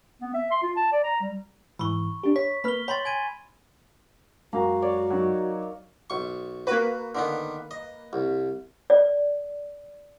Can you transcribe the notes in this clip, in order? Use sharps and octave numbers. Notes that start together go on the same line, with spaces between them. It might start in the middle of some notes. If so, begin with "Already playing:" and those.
B3
E5
C6
F4
A5
D5
A#5
G3
G#2 E3 B5 C#6
D4 G4
C#5 B6
A#3 B4 B5 F6 G7
C#5 G5 B5 C6 A6
G#5 G#6 D#7
F#2 G#3 A#3 F#4 F5 A#5
C#5 D5
F#3 D#4
B1 C#6
A#3 F#4 B4
D3 D#3 B3
D#5
C2
D5